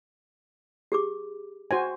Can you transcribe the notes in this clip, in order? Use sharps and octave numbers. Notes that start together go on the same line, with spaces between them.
G4 G#4 D6
F#4 C5 E5 G#5